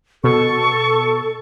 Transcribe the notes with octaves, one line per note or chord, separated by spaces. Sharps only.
B2 A4 C#6